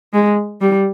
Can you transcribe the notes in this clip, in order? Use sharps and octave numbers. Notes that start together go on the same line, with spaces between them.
G#3
G3